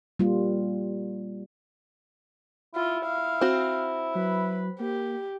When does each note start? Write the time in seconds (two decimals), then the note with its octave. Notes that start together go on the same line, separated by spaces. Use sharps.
0.20 G3 A#3 F4
2.75 E4 F4
3.05 F5
3.41 C4 F#4
4.15 F#3 B4
4.80 A#3 G4